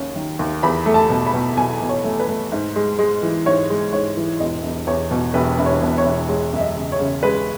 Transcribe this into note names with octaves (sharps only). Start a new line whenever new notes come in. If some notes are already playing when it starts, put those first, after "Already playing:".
Already playing: D#2 C#4
D#3
D#2
E2 B5
A3
A5
B2
B5
B2
B2 G#5
B2
C#5
A3
B4
A3
G#2
G#3
G#3
E3
G#2 C#5
G#3
G#2 C#5
E3
E1 D#5
E1
E2 C#5
B2
E1 B4
E1
C#5
B2
C#5
E1
G#3 C#5
F#2 E5
D#5
C#3
C#5
C#3
G#3 B4